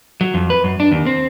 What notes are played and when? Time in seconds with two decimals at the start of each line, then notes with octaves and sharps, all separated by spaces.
0.21 F#3
0.34 F2
0.50 B4
0.64 F#2
0.80 D4
0.92 D#2
1.06 C4